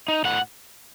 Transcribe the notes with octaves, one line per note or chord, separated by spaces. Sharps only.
D#4
A2 F#5